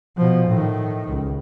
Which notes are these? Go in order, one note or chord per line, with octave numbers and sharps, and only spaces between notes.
B2 F3
A2 D#3
C#2